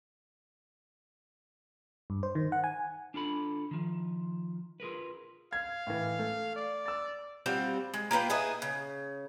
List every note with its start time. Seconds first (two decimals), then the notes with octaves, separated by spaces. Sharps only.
2.10 G2
2.23 C5
2.35 D#3
2.52 F#5
2.64 G#5
3.14 D4 F4 A4 B5
3.71 D#3 F3
4.80 F4 G#4 A#4 B4
5.53 F5 G#6
5.87 A2 E3
6.19 A3
6.56 D5
6.86 E6 A6
7.46 G3 C4 F4 F#4
7.94 G#3
8.11 A#3 F4 B4 G5
8.30 E4 G#4 B4 D#5
8.62 C#3